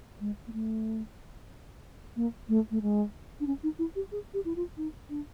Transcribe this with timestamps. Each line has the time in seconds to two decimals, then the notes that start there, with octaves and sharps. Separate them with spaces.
0.20 G#3
0.47 A#3
0.53 A3
2.16 A#3
2.49 A3
2.71 A3
2.82 G#3
3.40 D4
3.47 C#4
3.63 D#4
3.79 E4
3.96 G4
4.12 G#4
4.34 G4
4.45 E4
4.56 F4
4.77 D#4
5.10 D4